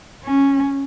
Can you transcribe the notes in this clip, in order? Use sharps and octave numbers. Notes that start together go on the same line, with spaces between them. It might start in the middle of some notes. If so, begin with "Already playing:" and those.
C#4